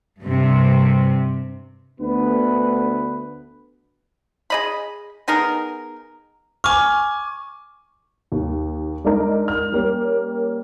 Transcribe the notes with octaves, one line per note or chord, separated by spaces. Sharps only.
G2 C3
D2 B3 B4
G#4 D#5 B5
B3 D#4 G#4 A#4
G#5 C#6 D6 F6
D#2
G#3 D4 D#4 A#4
F6
G3 A#3 C#4